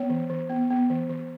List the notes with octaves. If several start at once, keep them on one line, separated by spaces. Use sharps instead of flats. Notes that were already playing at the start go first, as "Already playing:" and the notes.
Already playing: B3 C#5
E3
E3
B3
B3
E3
E3